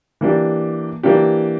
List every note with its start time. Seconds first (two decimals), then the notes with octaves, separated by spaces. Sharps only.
0.21 E3 A#3 D4 G4
1.03 E3 A#3 D4 G4